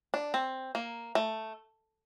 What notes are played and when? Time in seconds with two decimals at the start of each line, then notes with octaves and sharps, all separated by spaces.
0.14 D4
0.34 C4
0.75 A#3
1.15 A3